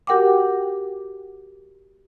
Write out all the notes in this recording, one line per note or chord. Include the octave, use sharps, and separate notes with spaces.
F#4 G4 A#4 F#5 G5 D6